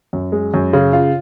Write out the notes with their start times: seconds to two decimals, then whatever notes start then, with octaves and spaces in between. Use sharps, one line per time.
0.13 F#2
0.32 G#3
0.54 F#2
0.73 C#3
0.93 F4